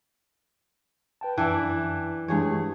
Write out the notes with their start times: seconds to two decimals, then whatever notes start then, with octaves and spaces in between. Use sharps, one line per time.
1.21 B4 G5 A5
1.38 F#2 E3 D4 E4
2.28 G2 E3 G#3 G#4 C#5